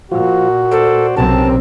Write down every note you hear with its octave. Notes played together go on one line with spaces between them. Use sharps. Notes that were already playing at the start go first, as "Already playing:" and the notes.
A#2 F3 F4 F#4
A4 C5 D5
B1 C3 C4 C#4 G4 A#4 A5